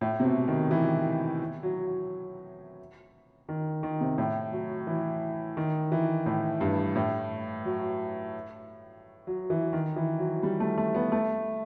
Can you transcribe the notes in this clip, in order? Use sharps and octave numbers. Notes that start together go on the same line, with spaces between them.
A2
C3
B2
D#3
E3
F#3
F#3
D#3
D#3
C3
A2
F#3
E3
D#3
E3
A2
G2
A2
F#3
F#3
E3
D#3
E3
F#3
G3
A3
A3
B3
A3